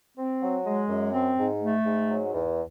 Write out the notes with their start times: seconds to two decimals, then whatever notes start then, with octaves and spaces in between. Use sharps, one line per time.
0.18 C4
0.41 F#3
0.66 G#3
0.89 F#2
1.13 C4
1.37 G#2
1.61 A3
1.86 G#2
2.09 F#3
2.33 E2